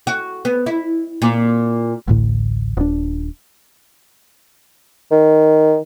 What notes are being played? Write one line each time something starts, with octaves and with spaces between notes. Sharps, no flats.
F#4
B3
E4
A#2
A1 D2 A2
D#1 D4
D#3